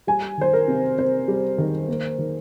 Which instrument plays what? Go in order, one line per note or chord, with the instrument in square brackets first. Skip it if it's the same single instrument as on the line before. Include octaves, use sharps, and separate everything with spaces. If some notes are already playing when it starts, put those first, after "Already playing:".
[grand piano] G3 [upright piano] G#5
[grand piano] D#3 [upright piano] C5
[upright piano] A#4
[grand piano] C3
[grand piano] C3 [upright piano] C5
[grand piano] G3
D#3
A#3
D#3